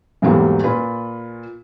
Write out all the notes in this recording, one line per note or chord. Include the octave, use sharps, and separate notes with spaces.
B1 E2 G#2 F#3 G3 A#3
A#2 F4 B4 B5